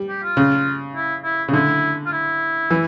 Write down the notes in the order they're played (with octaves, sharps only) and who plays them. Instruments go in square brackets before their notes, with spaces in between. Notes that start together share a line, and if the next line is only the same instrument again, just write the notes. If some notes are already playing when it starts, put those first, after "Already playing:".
Already playing: [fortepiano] G3
[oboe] G4
F4
[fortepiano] C#3
[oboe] E4
E4
[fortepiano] C#3
[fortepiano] D3 [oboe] E4
[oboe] F4
E4
[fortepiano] E3